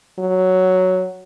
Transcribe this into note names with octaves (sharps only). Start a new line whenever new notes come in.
F#3